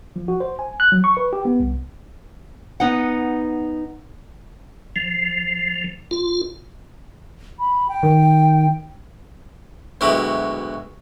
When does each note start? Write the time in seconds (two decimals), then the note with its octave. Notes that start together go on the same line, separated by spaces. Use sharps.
0.16 F3
0.28 F#4
0.40 C5
0.59 G#5
0.80 F#6
0.92 F#3
1.04 C#6
1.17 B4
1.33 G4
1.45 B3
1.60 C2
2.80 B3 D#4 F#5
4.96 F3
6.11 F4
7.59 B5
7.88 G5
8.03 D#3
10.01 D2 B2 F#3 G#3 E4 G4